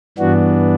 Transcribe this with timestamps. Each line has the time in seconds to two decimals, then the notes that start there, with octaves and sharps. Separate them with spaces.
0.18 G2 E3 B3 D4 F#4